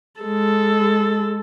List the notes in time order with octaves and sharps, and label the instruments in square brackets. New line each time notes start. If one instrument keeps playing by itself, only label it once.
[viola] G#3 A4